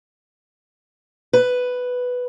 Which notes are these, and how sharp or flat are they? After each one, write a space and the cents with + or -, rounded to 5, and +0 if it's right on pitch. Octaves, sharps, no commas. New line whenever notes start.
B4 +5